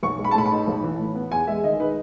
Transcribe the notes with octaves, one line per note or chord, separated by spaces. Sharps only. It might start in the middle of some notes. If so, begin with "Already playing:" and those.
B1 C#6
G#3
B5
A5
A2 B5
B5
D#4
B1
E3
A2
B3
E2 G#5
G#3 E5
D#3 D#5
D#4 B4